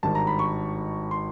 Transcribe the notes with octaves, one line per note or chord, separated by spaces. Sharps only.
G#1 G2 D#3 A5
A#5
B5
C#6
C6